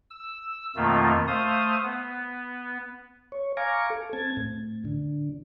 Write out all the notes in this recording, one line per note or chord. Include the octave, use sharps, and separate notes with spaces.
E6
F2 B2 D#3 A3 A#3 F4
A3 C5 F5 D#6
B3
C#5
F5 G#5 A#5 C#6 D6
A4
C4 A5 G#6
A2
D3